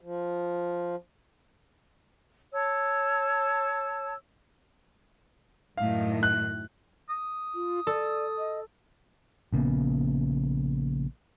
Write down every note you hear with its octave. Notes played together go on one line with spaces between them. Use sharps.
F3
C#5 A5 E6
F#2 A2 D#3 F5
F#6
D#6
F4
A4 D5
D#5
A#1 C#3 A#3 B3